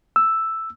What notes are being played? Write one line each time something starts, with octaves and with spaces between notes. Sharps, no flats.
E6